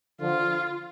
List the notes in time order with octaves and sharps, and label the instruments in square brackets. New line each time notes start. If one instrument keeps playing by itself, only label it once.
[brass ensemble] D3 F3 [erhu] F4